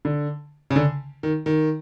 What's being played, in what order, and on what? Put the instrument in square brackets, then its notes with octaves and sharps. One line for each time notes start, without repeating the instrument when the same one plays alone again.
[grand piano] D3
C#3
D3
D#3
D#3